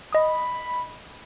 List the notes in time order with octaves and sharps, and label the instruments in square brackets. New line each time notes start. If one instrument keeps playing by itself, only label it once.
[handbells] D#5 D#6 [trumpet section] B5